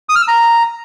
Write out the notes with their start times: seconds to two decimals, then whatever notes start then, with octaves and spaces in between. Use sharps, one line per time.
0.09 D#6
0.15 F6
0.22 E6
0.28 A#5